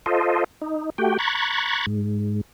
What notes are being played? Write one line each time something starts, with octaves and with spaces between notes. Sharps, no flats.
F4 A4 C5 D#5
D#4
A3 F#4 G4 G5
A#5 B5 C#6 F#6 G#6 A6
G#2